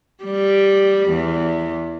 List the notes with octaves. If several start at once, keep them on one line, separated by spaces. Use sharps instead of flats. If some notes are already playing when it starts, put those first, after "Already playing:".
G3
E2